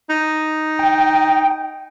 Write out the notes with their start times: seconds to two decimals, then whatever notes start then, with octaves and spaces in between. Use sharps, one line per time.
0.10 D#4
0.79 G5